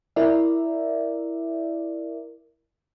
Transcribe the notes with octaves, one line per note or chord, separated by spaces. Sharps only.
E4 A#4 D5 E5